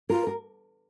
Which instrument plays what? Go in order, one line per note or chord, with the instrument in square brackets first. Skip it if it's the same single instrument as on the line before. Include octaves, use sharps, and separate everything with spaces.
[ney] F4 [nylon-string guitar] A#4
[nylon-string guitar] A#4